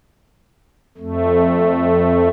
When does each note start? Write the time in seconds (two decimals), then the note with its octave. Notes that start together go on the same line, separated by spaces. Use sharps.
0.97 F2 A3